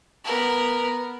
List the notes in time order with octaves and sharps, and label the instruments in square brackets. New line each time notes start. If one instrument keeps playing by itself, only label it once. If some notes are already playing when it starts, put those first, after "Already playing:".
[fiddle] B3 A#4